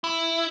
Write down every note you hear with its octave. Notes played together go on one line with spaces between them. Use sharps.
E4